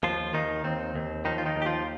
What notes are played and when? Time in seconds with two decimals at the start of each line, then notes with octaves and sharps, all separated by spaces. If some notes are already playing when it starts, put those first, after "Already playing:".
0.03 D#2 F3 F4
0.34 D#2 D#3 D#4
0.64 D#2 C4
0.96 D#2
1.25 D#3 F3 D#4
1.38 F4
1.46 D#3 D#4
1.56 D#2
1.62 G4
1.66 F3 F4